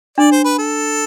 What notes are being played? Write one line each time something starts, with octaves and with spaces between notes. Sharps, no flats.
D4 D5
C5
B4
A4